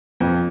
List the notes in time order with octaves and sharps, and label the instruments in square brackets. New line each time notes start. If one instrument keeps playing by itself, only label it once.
[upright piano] F2